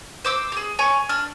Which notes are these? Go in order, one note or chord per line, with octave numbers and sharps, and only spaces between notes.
C5 D6 E6
G4 G#4
C#5 G#5 C#6
D4 F6